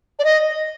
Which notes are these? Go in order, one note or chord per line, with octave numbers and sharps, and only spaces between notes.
D5
D#5